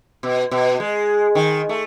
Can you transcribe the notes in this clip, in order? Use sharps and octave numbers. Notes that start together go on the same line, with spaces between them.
B2
B2
G#3
D#3
A3